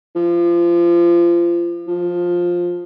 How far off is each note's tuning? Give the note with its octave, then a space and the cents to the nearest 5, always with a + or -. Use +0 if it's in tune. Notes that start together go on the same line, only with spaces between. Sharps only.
F3 -25
F3 +10